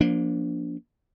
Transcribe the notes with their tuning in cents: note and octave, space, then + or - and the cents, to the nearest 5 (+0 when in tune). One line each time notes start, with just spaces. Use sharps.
F3 +0 A#3 +25 D4 -20